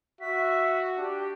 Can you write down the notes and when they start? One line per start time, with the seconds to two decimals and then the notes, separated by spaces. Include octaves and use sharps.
0.21 F#4 E5 B6
0.98 D4 G4